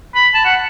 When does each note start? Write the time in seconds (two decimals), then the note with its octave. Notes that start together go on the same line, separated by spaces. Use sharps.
0.15 B5
0.35 A5
0.45 F#5